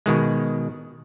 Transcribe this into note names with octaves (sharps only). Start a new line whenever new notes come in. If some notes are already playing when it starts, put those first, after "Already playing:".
B2 D#3 G#3